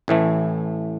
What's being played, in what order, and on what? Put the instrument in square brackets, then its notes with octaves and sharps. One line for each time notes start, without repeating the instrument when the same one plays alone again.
[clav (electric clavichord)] A1 A2 E3 A3